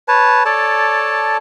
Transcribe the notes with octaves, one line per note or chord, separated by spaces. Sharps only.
B4 C#5 A5
A4 C#5 D5 A5